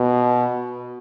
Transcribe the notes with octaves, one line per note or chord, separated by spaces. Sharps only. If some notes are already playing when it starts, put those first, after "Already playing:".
Already playing: B2